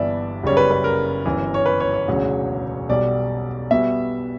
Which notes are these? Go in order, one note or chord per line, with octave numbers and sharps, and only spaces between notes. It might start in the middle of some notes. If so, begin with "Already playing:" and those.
Already playing: G1 G2 E3 B3 D5 E5
F#1 F#2 C#3 G3 C#5
B4
B4
A#4
G1 F#2 E3
C#5
B4
C#5
C#5
E1 D2 C#3 F#3
B1 B2 G3 D5
B2 G3 B3 E5